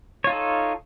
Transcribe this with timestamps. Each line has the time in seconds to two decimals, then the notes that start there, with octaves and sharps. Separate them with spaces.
0.24 C#5
0.27 F4
0.30 D#4
0.32 A4